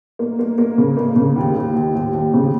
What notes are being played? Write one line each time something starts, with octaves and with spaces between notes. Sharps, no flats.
A#3
A#3
A#3
C#3
A#3
C#3
D#2
D#2
D#2
D#2
D#2
C#3